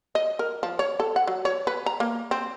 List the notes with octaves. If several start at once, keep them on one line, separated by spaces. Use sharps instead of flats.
D#5
A#4
F3
C#5
A4
F#5
F#3
C#5
B4
A#5
A#3
C4